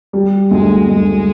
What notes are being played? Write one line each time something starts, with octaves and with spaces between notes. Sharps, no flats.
G3
D2 G#3
D2 G#3